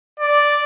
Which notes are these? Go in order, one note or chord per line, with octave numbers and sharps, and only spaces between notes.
D5